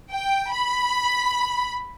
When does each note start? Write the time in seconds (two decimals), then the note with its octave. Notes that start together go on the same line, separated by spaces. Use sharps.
0.11 G5
0.51 B5